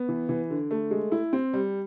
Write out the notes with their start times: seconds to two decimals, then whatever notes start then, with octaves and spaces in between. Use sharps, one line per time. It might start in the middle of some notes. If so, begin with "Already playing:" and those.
Already playing: B3
0.09 E3
0.29 E3
0.50 D3
0.71 A3
0.91 G#3
1.12 E4
1.33 C4
1.53 G3